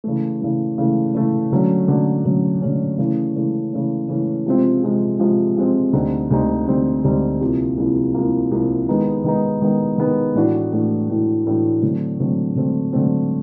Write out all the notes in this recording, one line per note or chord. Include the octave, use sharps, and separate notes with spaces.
C#3 E3 A3
C#3 E3 A3
C#3 E3 A3
C#3 E3 A3
D3 F#3 A3 C#4
D3 F#3 A3 C#4
D3 F#3 A3 C#4
D3 F#3 A3 C#4
C#3 E3 A3 C#4
C#3 E3 A3 C#4
C#3 E3 A3 C#4
C#3 E3 A3 C#4
C3 F3 G#3 C4 F4
C3 F3 G#3 C4 F4
C3 F3 G#3 C4 F4
C3 F3 G#3 C4 F4
D2 D3 G3 C4 D#4
D2 D3 G3 C4 D#4
D2 D3 G3 C4 D#4
D2 D3 G3 C4 D#4
C2 C3 F3 A#3
C2 C3 F3 A#3
C2 C3 F3 A#3
C2 C3 F3 A#3
D#3 G#3 B3 D#4
D#3 G#3 B3 D#4
D#3 G#3 B3 D#4
D#3 G#3 B3 D#4
A2 E3 A3 D4 F#4
A2 E3 A3 D4 F#4
A2 E3 A3 D4 F#4
A2 E3 A3 D4 F#4
D3 F#3 A3 C4
D3 F#3 A3 C4
D3 F#3 A3 C4
D3 F#3 A3 C4